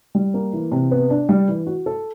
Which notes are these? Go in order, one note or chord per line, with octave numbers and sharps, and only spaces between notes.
G3
A#3
E3
C3
B3
D4
G3
E3
F#4
A4